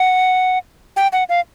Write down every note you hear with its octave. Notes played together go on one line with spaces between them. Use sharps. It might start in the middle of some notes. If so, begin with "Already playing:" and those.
Already playing: F#5
G5
F#5
F5